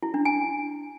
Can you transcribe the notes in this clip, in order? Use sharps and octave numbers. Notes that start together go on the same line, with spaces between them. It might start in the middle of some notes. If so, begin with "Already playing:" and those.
E4
D4
G#5